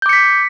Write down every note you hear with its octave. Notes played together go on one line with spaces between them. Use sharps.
D6 G6 B6 C#7